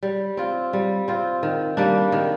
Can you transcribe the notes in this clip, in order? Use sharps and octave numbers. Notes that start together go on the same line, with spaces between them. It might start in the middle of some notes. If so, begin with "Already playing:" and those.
G3
C4 F4
G3
C4 F4
D#3
G3 A#3 D4
D#3